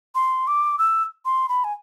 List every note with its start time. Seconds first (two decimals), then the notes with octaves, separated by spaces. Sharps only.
0.15 C6
0.47 D6
0.78 E6
1.25 C6
1.49 B5
1.64 G#5